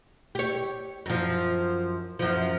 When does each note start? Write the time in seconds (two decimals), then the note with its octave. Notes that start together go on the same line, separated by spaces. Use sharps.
0.35 G4 C#5
1.06 F#2 F3
2.19 F#2 F3